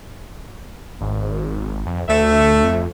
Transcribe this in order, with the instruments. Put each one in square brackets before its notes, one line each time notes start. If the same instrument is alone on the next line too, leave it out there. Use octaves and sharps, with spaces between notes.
[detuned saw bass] G#1
F2
[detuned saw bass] D2 [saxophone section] A3 E5
[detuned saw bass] F2